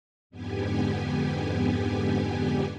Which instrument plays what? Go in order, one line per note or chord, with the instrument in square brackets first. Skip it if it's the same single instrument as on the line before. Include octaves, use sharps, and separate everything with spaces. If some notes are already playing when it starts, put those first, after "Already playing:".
[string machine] F2 G#2 D3 B3 G4 G#5